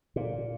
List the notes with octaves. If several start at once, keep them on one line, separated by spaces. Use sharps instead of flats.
A#2